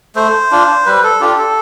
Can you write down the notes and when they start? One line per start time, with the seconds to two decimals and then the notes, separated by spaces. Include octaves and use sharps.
0.16 A3 C5
0.51 D4 F4
0.86 G3 B4
1.03 A4
1.20 D4 F4 G4
1.38 A4